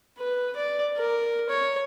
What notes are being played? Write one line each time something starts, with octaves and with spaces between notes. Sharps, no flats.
B4
D5
A#4
C#5